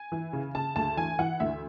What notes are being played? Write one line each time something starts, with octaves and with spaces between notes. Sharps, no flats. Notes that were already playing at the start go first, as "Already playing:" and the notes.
Already playing: G#5
E3
C#3
C#3 A5
D2 A5
E3 G#5
E3 F#5
D2 E5